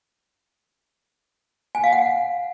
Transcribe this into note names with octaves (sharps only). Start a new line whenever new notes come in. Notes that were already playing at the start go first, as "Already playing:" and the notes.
G#5
F5
F#5